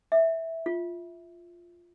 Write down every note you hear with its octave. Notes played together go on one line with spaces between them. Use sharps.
E5
F4